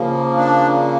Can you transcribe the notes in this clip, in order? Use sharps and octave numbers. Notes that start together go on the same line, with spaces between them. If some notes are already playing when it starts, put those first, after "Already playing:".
Already playing: C#3 F3 A#3
D4